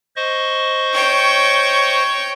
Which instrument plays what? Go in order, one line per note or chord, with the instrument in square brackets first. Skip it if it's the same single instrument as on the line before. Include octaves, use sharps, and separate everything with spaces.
[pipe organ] C5 D#5 C#6
[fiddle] C#5 G5